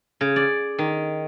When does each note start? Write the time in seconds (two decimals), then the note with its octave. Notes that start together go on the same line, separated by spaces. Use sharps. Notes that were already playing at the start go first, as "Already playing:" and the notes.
0.21 C#3
0.36 D5
0.79 D#3